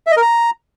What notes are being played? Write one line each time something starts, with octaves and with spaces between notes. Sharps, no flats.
E5
D#5
A#4
A#5